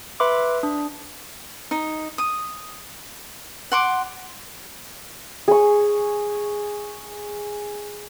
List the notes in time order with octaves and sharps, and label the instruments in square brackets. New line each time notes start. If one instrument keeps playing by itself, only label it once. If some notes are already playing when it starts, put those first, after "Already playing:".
[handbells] B4 E5 B5 C6 D6
D4
[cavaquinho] D#4
D#6
F#5 C6 D6
[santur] G#4 C#6